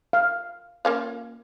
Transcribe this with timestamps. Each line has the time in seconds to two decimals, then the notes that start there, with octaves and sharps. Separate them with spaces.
0.13 F5
0.85 A#3 C#4 F4